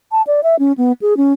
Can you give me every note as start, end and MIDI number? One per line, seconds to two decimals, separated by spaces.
0.12 0.22 81
0.27 0.41 74
0.43 0.56 76
0.59 0.73 61
0.78 0.92 59
1.02 1.17 68
1.17 1.33 61